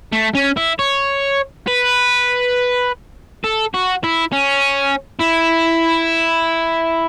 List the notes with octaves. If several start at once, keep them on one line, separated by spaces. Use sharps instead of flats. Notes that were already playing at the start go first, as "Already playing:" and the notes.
A3
C#4
E4
C#5
B4
A4
F#4
E4
C#4
E4